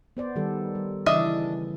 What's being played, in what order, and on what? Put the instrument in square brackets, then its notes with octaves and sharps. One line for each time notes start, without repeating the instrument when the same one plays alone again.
[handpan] B3 C5 D5
D#3 G3 A4
G3
[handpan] C#3 E3 [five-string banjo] D4 D#5 E5